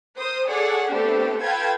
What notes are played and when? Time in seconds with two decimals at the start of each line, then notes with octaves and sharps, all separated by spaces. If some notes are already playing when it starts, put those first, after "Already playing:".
0.16 A#4 C5 D#6
0.48 G#4 A4 C#5 D5 F#5
0.91 A3 B3 C4 D4 G4 A4
1.41 F4 A4 B4 G5 A5 G#6